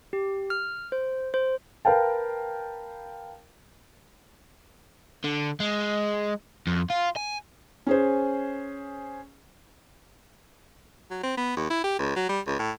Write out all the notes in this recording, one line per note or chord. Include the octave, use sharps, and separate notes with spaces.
G4
F6
C5
C5
A#4 B4 F5 G5 A5
D3
G#3
F2
F4
G#5
C#4 G#4 C5
F#3
C4
B3
D#2
E4
G4
C#2
F#3
G3
C#2
A2